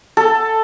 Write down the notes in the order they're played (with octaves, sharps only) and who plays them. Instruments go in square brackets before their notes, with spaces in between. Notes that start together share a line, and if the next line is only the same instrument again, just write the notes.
[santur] A4